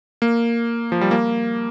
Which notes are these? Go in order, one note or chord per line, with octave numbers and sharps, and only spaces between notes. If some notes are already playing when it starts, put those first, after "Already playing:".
A#3
F3
G3
A#3